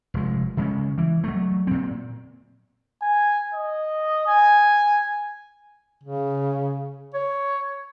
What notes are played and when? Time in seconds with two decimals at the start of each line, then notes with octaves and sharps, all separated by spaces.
0.14 F1 G#3
0.57 C#3 G#3 C#4
0.98 E3
1.24 F#3 A3
1.67 A#2 C4
3.02 G#5
3.54 D#5
4.27 G#5
6.03 C#3
7.14 C#5